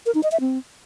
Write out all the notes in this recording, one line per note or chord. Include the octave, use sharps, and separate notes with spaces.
A#4
D#4
D#5
E5
C4